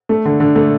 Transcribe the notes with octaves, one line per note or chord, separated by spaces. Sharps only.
A3
D3
D3
A3